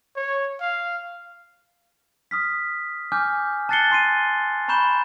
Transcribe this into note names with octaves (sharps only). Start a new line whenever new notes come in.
C#5
F5
D#6 F6 B6
G#5 D6 F6 G6
A5 F#6 A6 C7 C#7 G7
G#5 C6 C7 D#7
A#5 B5 C#6 G6 E7 G7